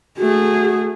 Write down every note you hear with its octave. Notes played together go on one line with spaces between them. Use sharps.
A3 F#4 G#4